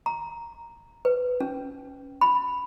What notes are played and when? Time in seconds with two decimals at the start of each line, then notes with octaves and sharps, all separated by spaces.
0.06 A#5
1.05 B4
1.40 C#4
2.21 B5